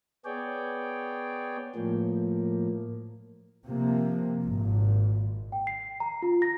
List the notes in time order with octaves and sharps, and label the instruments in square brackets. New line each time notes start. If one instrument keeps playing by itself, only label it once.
[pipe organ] B3 G#4 C#5 D5 G5
A2 F3 A#3
[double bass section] C3 F3 A#3
G#1 A#2
[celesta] G5
C7
A#5
F4
A#6